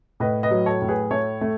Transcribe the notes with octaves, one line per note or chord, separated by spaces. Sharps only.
A2 B4 D#5
B4 D#5
F#3
A4 C#5
A2
G#4 B4
A3 A4 C#5
A3